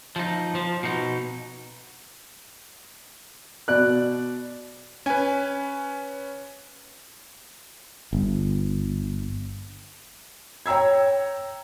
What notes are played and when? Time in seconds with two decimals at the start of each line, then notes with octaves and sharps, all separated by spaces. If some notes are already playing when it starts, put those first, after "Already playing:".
0.16 F3 D#4
0.55 F3
0.83 B2 D#4
3.68 B2 D5 F#6
5.06 C#4 B4 G#5
8.13 G1
10.66 C#5 G5 A#5 E6 G#6